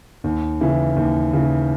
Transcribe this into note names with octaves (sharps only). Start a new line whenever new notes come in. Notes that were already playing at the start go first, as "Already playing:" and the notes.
D#2
C#3 E3
D#2
C#3 E3